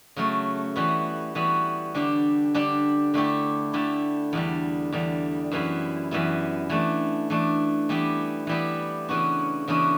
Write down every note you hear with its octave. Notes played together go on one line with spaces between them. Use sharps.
C#3 F#3 A3
E3 G3 B3 F#4
E3 G3 B3 F#4
D3 G3 D4 G4
D3 G3 D4 G4
D3 A3 E4 G4
D3 A3 E4 G4
E2 D3 G3
E2 D3 G3
F#2 E3 G3 B3 E4
F#2 E3 G3 B3 E4
E3 A3 D4
E3 A3 D4
E3 G3 B3 E4 G4
E3 G3 B3 E4 G4
C#3 E3 B3 D4 F#4
C#3 E3 B3 D4 F#4